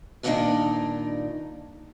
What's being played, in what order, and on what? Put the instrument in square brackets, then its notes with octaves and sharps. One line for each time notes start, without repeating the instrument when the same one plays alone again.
[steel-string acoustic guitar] G2 A#2 D#3 G#3 D4 D#4